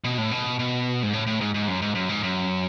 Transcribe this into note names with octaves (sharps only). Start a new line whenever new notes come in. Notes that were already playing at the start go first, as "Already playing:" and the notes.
B2
A2
B2
B2
G#2
A2
A2
G#2
G#2
F#2
G#2
F#2
G#2
F#2